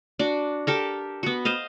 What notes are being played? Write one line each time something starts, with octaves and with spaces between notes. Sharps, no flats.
D4 F#4
G4 A4 A#4
B3 F#4
C5 D#5 F5